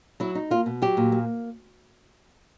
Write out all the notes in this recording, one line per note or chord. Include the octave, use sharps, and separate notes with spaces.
F#3 E4
D#4
A#3 F4
B2
F#3 G4
A#2
A#3